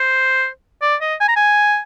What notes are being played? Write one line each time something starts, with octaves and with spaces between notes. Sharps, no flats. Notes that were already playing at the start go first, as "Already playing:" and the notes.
Already playing: C5
D5
D#5
G#5
A#5
G#5